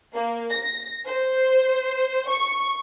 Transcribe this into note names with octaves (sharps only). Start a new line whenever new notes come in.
A#3
A#6
C5
C#6